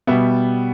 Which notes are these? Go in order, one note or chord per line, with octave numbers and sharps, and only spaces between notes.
B2 G3 B3 E5